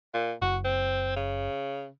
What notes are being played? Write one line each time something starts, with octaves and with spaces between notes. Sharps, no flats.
A#2
F#1 F#4
C4
C#3